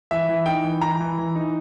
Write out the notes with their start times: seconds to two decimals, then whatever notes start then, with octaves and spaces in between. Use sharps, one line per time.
0.11 E3 E5
0.29 E3
0.46 D#4 G5
0.64 E3
0.81 E3 A#5
1.01 E3
1.18 E3
1.35 D#4